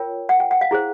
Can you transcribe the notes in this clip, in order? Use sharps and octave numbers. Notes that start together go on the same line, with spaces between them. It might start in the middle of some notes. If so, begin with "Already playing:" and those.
Already playing: F4 A#4 C#5 G5
F#5
G5
F#5
F5
E4 G#4 C5